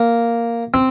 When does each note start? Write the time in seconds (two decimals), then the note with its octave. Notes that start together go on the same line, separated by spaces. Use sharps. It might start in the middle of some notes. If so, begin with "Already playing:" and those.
Already playing: A#3
0.74 C4